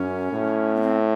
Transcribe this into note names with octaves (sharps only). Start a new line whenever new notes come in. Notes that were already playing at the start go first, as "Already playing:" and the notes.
Already playing: F#2 C#4
A2
B3
C4